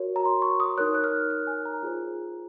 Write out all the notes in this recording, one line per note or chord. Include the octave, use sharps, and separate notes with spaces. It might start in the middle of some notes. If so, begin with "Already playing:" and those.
Already playing: F#4 A#4 C#5
A#5
C6
C#6
D#6
D#4 A#4 C#5 F#6
F#6
F6
F6
G#5
A#5
F4 G#4 C5